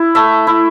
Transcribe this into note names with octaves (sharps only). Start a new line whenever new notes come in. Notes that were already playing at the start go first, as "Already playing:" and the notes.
Already playing: E4
A3 E5
E4